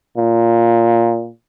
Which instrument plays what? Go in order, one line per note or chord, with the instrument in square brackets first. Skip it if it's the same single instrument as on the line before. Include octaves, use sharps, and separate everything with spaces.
[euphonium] A#2